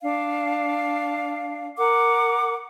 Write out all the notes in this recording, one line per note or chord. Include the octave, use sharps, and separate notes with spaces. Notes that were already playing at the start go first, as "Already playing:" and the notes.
D4 F5
A#4 F#5 D6